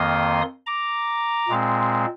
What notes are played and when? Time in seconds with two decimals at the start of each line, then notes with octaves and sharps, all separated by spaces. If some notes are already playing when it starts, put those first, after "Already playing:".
Already playing: F2 D#3 A#3 C6 D#6
0.66 A#5 D6
1.48 A#2 G#3 C4